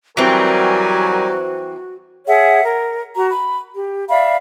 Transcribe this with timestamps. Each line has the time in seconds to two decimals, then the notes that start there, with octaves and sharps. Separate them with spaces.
0.17 E3 F#3 G3 C4 F#4 A#4 G#5
2.27 G#4 C#5 E5 F#5
2.63 A#4
3.14 F#4 A#5
3.29 B5
3.75 G4
4.09 D5 E5 F5 B5